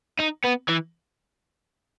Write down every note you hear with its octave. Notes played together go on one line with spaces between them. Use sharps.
D#4
B3
E3